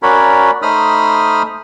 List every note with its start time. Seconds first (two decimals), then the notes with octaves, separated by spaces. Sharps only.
0.03 C#4 F#4 A#4 C#5 D5 B5
0.62 A3 D#4 C5 B5 D#6 F6